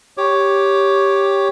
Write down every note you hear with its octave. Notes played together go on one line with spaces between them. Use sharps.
G4 C#5 D6